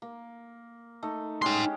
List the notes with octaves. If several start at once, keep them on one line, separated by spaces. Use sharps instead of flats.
A#3
A3 D#4
G#3 C#4 D#4 G4 C6